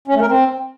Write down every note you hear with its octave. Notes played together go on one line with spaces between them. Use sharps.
C#4
A3
A#4
C4